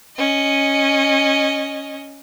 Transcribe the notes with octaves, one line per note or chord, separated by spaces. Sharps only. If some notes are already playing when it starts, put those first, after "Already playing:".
C#4 D#5